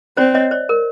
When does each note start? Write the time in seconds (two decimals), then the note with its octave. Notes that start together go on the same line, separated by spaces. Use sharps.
0.17 C4 C5 D5
0.35 C#5 D#5
0.51 C5 D5
0.69 A#4